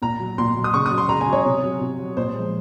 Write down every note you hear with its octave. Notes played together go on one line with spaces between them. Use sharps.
A#2 A#5
F#3
A#2 C6
F#3
D#6
C#3 C#6
D#6
F#3
C6
C#3 A#5
G#5
F#3
C#5
C3
F#3
C3
F#3
A#2 C5
F3 G#3